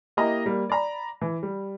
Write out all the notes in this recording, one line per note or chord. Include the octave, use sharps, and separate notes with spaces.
A#3 E4 G4 D#5 A#5
G3 A#3
D5 A#5 B5
E3
G3